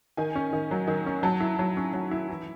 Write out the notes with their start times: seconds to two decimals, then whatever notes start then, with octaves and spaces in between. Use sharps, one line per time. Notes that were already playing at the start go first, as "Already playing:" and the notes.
0.17 D#3 G#5
0.35 C#4
0.53 D#3
0.71 F#3
0.88 D#3
1.06 C#4
1.23 F#3 A5
1.40 E4
1.59 F#3
1.77 C#4
1.94 F#3
2.11 E4
2.29 E3